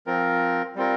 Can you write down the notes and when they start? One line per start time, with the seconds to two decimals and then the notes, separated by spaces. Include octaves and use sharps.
0.06 F3 C4 F4 A#4
0.75 G3 C4 F4 A#4